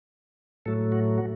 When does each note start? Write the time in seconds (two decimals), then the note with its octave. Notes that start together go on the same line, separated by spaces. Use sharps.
0.66 A2 F#3 A3 A4
0.92 F#4
1.18 F#4